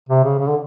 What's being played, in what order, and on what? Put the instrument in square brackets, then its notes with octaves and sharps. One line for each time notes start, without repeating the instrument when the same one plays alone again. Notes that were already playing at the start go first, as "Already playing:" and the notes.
[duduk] C3
C#3
C#3
D3